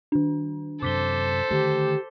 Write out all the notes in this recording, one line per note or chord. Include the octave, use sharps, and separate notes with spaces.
D#3 D4
F#2 C3 A4 C5 D6 B6 G7
D3 D#3 A3 G4